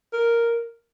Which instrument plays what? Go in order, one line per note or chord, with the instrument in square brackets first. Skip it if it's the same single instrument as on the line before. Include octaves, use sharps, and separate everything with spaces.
[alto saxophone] A#4